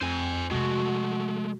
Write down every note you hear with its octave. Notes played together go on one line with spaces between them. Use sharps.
F2 C5 G#5
C3 F3 G#3 A3 F#4